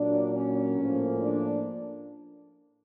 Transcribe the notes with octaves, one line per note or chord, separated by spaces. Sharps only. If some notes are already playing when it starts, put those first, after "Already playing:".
Already playing: A#2 F#3 A#3 D4
C#4
A2 F3 A#3
D4